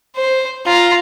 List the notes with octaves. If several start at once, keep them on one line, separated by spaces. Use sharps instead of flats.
C5
F4 A#5